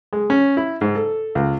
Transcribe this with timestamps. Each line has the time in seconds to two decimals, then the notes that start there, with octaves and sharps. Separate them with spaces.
0.13 G#3
0.30 C#4
0.57 E4
0.81 G#2
0.95 A4
1.35 C#2